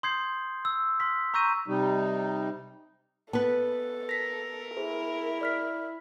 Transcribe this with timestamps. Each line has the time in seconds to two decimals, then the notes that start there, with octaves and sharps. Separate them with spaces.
0.03 C6 D#6 G6 G#6 C7
0.65 E6
1.00 C6 D#6 F6 B6
1.34 A#5 C#6 E6 G6 A#6 D#7
1.68 C3 G3 D#4
3.33 B3 A4 B4 A5
4.09 A#4 A#6 B6
4.77 E4 G#4 C5
5.41 D5 F6 B6